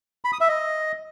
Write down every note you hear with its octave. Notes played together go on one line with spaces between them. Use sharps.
B5
D#6
E5
D#5